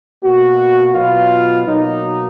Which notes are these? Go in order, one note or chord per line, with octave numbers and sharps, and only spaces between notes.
B2 A#3 F#4
B2 F#3 B3 F4
B2 F#3 A#3 D#4